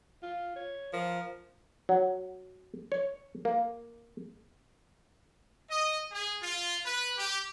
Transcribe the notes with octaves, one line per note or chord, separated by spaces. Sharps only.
F4
C#5
F3 A#4
F#3
C#5
A#3
D#5
G#4
F4
B4
G4